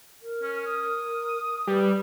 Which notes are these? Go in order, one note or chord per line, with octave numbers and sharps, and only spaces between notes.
A#4
C#4
D#6
G3 B4